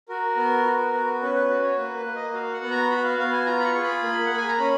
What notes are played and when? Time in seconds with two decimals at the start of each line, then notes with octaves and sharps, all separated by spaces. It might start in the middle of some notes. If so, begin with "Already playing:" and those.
0.09 F#4 A#4
0.36 B3
0.65 F#4
0.93 B3
1.22 C#4 B4
1.35 B4
1.49 F#4 B4
1.63 C#5
1.77 A#3 B4
1.97 B4
2.06 A#3
2.15 D#5
2.30 D#5
2.33 F#4 F5
2.53 F#5
2.61 B3
2.71 A#5
2.90 F#4 B5
3.04 F5
3.18 B3 F5
3.33 G#5
3.46 F4 A#5
3.60 B5
3.64 C#6
3.75 G#4
3.84 B5
4.03 A#3
4.25 F#5
4.31 A#3
4.38 G#5
4.48 A#5
4.58 C#4 B5